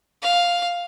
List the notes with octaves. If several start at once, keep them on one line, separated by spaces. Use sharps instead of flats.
F5